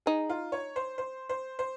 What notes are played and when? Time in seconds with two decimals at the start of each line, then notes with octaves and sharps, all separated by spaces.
0.06 D#4 G#4
0.29 F4
0.52 C#5
0.76 C5
0.98 C5
1.29 C5
1.59 C5